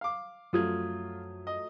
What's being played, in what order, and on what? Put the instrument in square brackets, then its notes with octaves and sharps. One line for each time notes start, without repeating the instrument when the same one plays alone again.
[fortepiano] F5 D6
[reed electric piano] F#2 D#6 G#6 [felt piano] F3 F#3 A3 [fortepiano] F4
[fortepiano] D#5